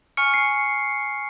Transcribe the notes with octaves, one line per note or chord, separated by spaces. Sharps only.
G#5 C#6 F6 C#7
C7